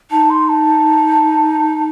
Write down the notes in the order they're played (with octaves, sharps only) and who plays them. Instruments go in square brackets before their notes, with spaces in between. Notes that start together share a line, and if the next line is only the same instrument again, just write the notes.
[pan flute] D#4 [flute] A5
[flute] C6
A5